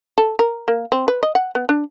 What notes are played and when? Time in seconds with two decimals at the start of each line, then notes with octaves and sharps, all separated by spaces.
0.18 A4
0.39 A#4
0.68 A#3
0.92 C4
1.08 B4
1.23 D#5
1.35 F#5
1.55 B3
1.69 D4